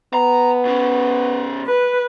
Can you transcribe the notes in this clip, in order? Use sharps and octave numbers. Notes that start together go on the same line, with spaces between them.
B3 A#5
B2 C#4
B4